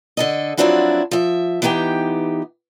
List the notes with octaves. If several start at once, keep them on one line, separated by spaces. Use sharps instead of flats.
D3 A4 D#5
F3 F#3 C4 D4 E4 F#4
F3 E5
E3 B3 D#4 G4 G5